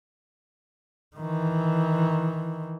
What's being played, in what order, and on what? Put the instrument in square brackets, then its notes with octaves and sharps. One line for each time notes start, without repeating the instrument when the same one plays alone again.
[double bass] D#3 E3